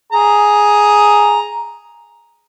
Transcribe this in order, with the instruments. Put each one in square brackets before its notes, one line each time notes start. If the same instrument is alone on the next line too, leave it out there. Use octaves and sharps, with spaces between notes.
[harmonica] G#4 A#5